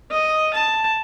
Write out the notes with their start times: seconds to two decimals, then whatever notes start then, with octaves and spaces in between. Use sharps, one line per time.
0.11 D#5
0.54 A5